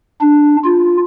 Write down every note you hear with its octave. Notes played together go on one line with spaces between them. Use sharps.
D4
F4